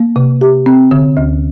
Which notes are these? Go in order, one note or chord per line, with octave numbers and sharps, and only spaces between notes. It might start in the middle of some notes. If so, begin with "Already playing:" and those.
Already playing: A#3
C3
G4
C4
D3
D2